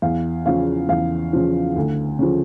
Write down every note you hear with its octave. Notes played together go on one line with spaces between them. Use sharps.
E2 F5
C#3 F3 F5
E2 F5
C#3 F3
D2
C#3 F3